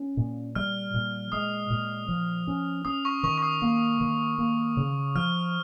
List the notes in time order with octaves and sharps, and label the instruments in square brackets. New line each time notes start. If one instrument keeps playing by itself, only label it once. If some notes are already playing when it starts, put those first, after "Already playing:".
Already playing: [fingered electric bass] C#4
A#2
[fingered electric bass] G3 [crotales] F6
[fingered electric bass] A#2
[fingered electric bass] G#3 [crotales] D#6
[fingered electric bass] A#2
F3
C#4
[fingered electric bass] C#4 [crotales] D#6
[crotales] C#6
[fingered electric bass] D#3 [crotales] C#6
[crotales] C#6
D#6
[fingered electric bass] A#3
D#3
A#3
C#3
[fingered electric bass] F3 [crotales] F6